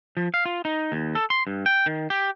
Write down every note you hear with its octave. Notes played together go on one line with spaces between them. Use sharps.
F3
F5
F4
D#4
D#2
A4
C6
G2
G5
D#3
G4